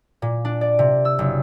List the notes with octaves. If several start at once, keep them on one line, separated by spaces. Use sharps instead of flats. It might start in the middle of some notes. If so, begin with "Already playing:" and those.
A#2
D4
D5
C3
E6
F#1